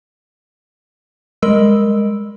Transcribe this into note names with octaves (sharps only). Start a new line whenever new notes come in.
G3 G#3 A#4 D#5 E6